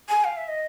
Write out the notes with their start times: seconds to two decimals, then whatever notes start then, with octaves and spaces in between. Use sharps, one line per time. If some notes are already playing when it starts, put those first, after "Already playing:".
0.09 G#5
0.24 F5
0.37 E5
0.48 D#5